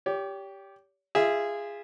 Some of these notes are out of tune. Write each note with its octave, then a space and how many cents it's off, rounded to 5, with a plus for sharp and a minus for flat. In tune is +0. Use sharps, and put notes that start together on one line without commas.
G4 +0 C#5 +40
F4 -25 G#4 -15 E5 -10